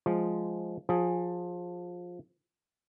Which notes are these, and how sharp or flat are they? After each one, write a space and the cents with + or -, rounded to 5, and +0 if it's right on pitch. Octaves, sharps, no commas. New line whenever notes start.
F3 +0 G#3 +0
F3 +20 G#4 +0